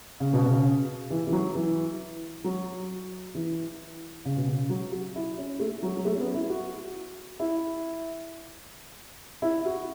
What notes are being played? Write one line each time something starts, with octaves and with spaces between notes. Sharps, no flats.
C#3
B2
C#3
E3
E3
F#3
E3
F#3
E3
C#3
B2
C#3
F#3
F#4
E4
C#4
A3
F#3
F#3
A3
C#4
B3
E4
F#4
E4
E4
F#4